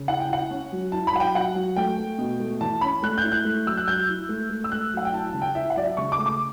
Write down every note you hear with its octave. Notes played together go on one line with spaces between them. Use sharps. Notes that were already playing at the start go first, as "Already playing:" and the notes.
Already playing: C#3
E4 F#5
G5
E4 F#5
C#4
F#3
E4 A5
B5
F#3 F#5
G5
F#3 F#5
F#3
A3 G5
A3
B2
A3
E3 A5
C#4 B5
A3 F#6
G6
E4
F#6
A3
F#3 E6
F#6
F#3 G6
E4
A3
A3
E6
A3 F#6
F#3 F#5
G5
E4 A5
A5
C#3
G5
E4 E5
F#5
F#3 D5
E5
C#3 C#6
D6
A3
D6